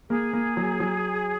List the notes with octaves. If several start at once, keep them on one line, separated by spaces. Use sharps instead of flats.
A#3 G#4
A#3
F#3
F#3